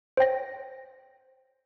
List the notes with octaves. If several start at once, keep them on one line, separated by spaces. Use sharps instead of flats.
C5 C#5 G5 A#6